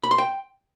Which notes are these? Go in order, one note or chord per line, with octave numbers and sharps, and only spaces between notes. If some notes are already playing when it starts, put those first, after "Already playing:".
B5
C6
G5